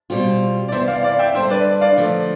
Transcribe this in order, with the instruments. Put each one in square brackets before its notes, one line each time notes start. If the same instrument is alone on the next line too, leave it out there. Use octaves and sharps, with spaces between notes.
[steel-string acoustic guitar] B2 G3 C4 F4
[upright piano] D5
[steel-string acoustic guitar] C3 E3 B3 E4 [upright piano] C5 E5
[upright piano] D5 F5
D5 F5
E5 G5
[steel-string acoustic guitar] G2 D3 G3 D4 [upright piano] C5 E5
[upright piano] B4 D5
D5 F5
[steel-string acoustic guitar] D3 F3 A3